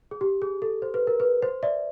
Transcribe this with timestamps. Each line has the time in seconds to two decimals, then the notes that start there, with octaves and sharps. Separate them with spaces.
0.11 G#4
0.21 G4
0.42 G#4
0.62 A4
0.82 C5
0.94 B4
1.07 A#4
1.20 B4
1.43 C5
1.63 D5 E5